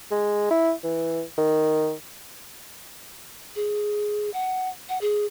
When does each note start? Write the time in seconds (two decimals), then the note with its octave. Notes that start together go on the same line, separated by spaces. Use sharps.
0.11 G#3
0.51 E4
0.84 E3
1.38 D#3
3.56 G#4
4.34 F#5
4.89 F#5
5.01 G#4